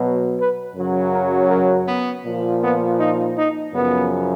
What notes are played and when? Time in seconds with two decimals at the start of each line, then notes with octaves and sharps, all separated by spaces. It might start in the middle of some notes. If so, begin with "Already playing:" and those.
Already playing: B2 F#3
0.38 B4
0.75 F#2 C#3 F#3
1.12 A#4
1.50 A#4
1.87 B3
2.24 A#2 F3
2.61 B3
2.99 D#4
3.36 D#4
3.74 F#2 C#3 F3 B3